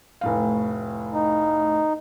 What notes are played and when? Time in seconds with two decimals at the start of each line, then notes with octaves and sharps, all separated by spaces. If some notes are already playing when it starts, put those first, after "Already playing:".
0.21 F1 A2 F5
1.14 D#4